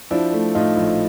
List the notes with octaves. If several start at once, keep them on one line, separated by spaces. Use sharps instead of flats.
F3 D4 E4
A3
A2 D#4 F4
A#1